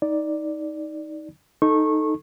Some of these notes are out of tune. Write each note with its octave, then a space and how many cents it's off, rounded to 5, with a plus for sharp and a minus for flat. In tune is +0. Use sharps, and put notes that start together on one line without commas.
D#4 +15 D5 +0
D#4 +0 A4 +0 C#6 -25